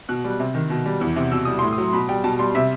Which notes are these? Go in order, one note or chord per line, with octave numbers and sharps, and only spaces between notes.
B2 F#6
G3
C3
D#3
B2
G3
E2
C3
B2 E6
G3 D#6
A2 C6
D#6
F#3
B2 B5
G3 G5
B2 A5
G3 C6
C3 E5